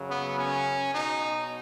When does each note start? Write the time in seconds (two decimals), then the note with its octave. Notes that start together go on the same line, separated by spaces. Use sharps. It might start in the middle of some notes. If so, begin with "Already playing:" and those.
Already playing: F#2 C#3 F#3
0.09 B3
0.37 C#4
0.93 B2 F#3 D#4